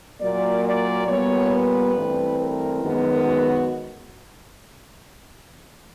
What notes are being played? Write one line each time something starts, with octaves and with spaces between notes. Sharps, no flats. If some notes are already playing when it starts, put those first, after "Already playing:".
A#2 F#3 A#3 D5
D5
A#2 G3 B3 C#5
B4
G2 E3 A3 C4
A#4
F#2 D#3 G#3 B3
F#4